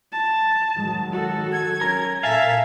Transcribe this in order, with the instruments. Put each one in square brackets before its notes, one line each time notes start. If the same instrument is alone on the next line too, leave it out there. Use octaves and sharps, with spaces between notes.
[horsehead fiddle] A5
[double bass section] D#3 F#3 G#3
[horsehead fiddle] F#4 A4
[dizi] G#6
[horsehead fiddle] C#4 [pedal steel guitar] A#4
[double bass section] A#2 [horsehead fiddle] A4 A#4 [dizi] E5 [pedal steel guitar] F5 G#5 A5